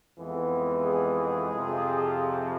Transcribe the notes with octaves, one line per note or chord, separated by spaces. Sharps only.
F2 E3 G#3 B3
G#4
F2 C3 F3